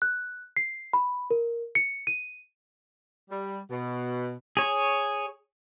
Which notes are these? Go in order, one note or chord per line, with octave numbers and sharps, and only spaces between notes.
F#6
C7
B5
A#4
C#7
D#7
G3
B2
G#4 C#5